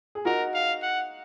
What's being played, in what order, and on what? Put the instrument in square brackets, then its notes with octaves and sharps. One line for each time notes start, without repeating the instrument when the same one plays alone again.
[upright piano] G#4
[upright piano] D#4 F#4 [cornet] A#4
[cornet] F5
F#5